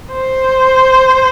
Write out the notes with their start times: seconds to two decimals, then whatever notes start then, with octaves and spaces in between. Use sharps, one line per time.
0.12 C5